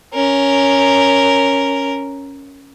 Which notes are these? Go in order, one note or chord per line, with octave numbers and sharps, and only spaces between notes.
C#4 A#4